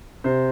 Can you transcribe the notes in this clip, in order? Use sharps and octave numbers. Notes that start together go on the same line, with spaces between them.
C3 C5